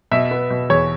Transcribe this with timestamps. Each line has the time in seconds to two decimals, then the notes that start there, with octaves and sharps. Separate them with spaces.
0.11 B2 E5
0.31 B3
0.50 B2
0.70 E2 C#5